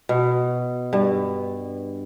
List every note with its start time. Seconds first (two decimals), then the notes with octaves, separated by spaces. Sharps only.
0.09 B2
0.93 G2